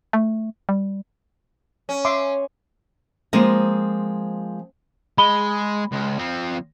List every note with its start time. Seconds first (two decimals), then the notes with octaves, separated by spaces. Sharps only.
0.13 A3
0.69 G3
1.89 C#4
2.05 E5 C6 D6
3.33 F3 G#3 A#3 C4 D#5
5.18 G#3 B5 G7
5.92 C#2
6.18 F3 C4